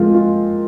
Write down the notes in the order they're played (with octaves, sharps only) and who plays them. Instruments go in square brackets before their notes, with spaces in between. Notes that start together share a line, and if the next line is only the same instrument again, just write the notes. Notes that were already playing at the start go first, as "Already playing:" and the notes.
Already playing: [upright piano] F3 G#3 A#3 C4 F4
F4